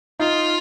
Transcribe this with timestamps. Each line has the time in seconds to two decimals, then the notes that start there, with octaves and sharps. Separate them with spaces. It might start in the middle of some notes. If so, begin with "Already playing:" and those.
0.19 D#4 F4